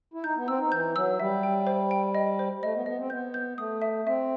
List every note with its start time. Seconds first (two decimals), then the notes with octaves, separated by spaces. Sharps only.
0.14 E4
0.24 D#4 G6
0.36 B3
0.48 C4 E6
0.59 D#4
0.72 E3 G6
0.96 F#3 E6
1.19 G3 E5
1.43 G5
1.67 C5
1.91 G5
2.15 D#5
2.39 C5
2.63 A3 D#5
2.75 B3
2.86 B3 D#5
2.99 C4
3.10 B3 G6
3.34 G6
3.58 A3 D#6
3.82 E5
4.06 C4 E5